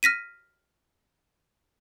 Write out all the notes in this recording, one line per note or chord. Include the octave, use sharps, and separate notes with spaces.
F6 A#6 B6 D#7